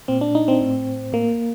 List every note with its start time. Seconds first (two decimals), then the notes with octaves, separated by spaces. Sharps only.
0.08 A#2 C4
0.21 D4
0.35 D#4
0.48 C4
0.61 A2
1.12 A2 A#3